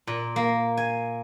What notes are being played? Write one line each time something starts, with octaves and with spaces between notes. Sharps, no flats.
A#2
A#3
G#5